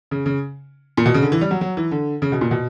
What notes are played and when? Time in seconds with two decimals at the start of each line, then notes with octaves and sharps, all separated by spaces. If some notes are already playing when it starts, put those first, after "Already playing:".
0.11 C#3
0.26 C#3
0.97 A#2
1.06 B2
1.14 C#3
1.22 D3
1.32 E3
1.41 G3
1.51 F#3
1.61 F#3
1.77 E3
1.91 D3
2.22 C#3
2.32 B2
2.41 A#2
2.51 B2